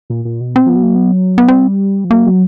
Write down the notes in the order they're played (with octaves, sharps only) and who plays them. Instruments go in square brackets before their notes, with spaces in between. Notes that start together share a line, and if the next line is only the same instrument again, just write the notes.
[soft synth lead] A#2
A#2
B2
[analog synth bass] C4
[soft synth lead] F3 [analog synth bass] B3
[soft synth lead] F#3
[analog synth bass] A#3
B3
B3
[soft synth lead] G3 [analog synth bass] C4
[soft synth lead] F3
[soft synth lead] F#3 [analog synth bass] A#3
[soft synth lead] F#3